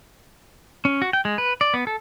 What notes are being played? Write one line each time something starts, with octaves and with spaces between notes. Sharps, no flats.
C#4
F#4
G5
G#3
B4
D5
B3
A4